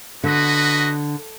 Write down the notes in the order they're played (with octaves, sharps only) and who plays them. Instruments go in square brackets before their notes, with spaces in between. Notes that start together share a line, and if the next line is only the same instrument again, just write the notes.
[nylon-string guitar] D3 [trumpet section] F#4 B4 D#5